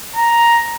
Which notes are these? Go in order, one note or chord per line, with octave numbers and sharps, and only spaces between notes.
A#5